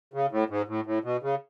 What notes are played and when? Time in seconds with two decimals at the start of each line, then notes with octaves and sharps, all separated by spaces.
0.14 C#3
0.31 A2
0.49 G#2
0.68 A2
0.86 A2
1.04 B2
1.22 C#3